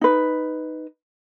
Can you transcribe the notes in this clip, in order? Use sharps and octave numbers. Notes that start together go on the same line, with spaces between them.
D#4 B4